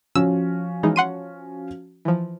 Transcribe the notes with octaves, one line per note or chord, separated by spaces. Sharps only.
F3 C#4 F#4 E6
E3 G#3 D#4
F#5 C6 D#7
E3 F3